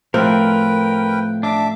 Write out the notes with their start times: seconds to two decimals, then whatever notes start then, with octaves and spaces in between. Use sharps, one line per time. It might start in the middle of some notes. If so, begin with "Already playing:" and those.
0.14 A2 F3 C4 A#4 B4 G5 F#6
1.43 D4 E5 D6